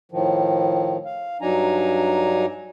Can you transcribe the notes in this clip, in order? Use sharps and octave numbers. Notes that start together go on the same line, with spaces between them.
A2 D#3 F3
F5
G2 F#3 D4 D#4 G#5 A#5